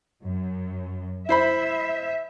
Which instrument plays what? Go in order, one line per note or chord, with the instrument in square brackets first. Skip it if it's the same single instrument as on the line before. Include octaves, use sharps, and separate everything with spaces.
[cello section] F#2
[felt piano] E4 C5 B5 [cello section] E5